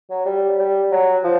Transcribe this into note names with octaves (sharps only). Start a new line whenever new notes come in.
F#3
G3
G3
F#3
F3